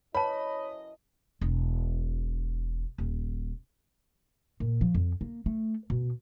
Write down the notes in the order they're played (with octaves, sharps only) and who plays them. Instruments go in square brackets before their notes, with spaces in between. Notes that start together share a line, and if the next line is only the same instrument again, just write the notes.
[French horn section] F#2 E4 D#5 [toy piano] B4 A5 [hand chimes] C#5 [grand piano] B5
[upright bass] E1
D#1
A#2
F3
F2
A#3
A3
B2